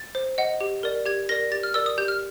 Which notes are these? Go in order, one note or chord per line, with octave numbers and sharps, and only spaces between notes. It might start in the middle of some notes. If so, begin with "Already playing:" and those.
Already playing: A6
C5
D#5 F#5
G4
A#4 D5
G4 G#6
A#4 D5 A#6
G4 A6
F6
A#4 D5 E6
D#6
G4 G6
F6